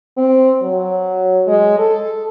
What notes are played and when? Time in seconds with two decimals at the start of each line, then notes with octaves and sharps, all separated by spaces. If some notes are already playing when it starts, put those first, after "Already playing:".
0.17 C4
0.63 F#3
1.47 G#3
1.79 A4